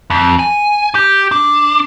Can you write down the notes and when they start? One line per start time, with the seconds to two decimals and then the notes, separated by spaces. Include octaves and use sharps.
0.10 F2
0.39 G#5
0.95 G4
1.32 D4